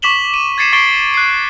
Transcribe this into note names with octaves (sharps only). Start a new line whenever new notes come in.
C#6 D6 B6 E7 F#7 G7
D#7
G#6 A6 C7 C#7 D#7 E7
C#6 A6 C7 D7 G7
F#6 C7